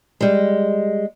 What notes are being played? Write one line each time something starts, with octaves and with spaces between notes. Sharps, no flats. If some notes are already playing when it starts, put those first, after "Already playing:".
G3 G#3